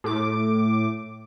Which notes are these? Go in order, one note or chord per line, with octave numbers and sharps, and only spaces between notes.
A2 D6